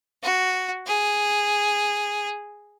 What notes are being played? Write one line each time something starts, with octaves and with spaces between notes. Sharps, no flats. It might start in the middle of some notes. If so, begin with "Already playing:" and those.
F#4
G#4